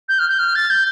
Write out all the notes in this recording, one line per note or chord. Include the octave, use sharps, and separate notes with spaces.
G6
F6
G6
F6
A6
G6